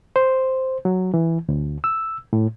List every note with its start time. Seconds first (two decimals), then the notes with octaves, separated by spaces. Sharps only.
0.16 C5
0.85 F#3
1.14 E3
1.49 D2
1.84 E6
2.33 A2